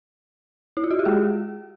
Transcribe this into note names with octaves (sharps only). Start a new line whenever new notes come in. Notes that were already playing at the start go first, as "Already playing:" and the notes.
E4
F4
F#4
G4
G#3 G#4